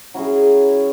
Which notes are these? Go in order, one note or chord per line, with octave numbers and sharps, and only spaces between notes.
F#3 C#4 E4 G#4